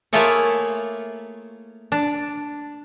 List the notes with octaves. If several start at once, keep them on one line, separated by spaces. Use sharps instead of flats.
A3 A#3 E4 F4 G#4 C#5
D4